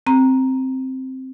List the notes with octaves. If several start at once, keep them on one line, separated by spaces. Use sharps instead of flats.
C4 A#5